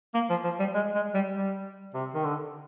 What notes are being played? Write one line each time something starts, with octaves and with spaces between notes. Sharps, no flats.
A#3
F3
F3
G3
G#3
G#3
G3
G3
C3
D#3
D3